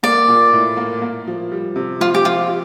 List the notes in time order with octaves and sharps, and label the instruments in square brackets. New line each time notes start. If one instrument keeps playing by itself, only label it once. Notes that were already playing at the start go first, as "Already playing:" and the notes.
[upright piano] A#3 [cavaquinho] D5
[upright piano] A#2
A2
A#3
A#3
F3
G3
C3
[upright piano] F3 [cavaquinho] F4
[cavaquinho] G4
[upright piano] F3 [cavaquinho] F4